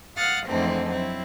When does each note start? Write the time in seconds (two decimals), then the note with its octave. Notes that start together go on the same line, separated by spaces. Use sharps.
0.17 F5 F#5 D#6 F6 A6
0.48 F2 G#2 D3 E3 A3 C4
0.90 F#3 C4 E4